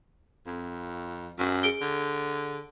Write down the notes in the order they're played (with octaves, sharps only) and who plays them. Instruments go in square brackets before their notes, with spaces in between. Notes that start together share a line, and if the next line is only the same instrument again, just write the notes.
[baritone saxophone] F2
F#2
[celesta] G#4 D7 G7
[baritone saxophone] D3